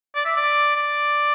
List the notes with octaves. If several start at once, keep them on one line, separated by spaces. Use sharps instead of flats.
D5
E5
D5
D5